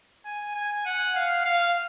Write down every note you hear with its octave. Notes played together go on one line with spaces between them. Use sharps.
G#5
G#5
F#5
F5
F5